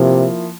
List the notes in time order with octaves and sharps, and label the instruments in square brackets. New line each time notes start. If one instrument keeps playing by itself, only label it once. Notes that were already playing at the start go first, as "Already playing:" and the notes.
Already playing: [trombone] C3 [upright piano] F3 A#3 E4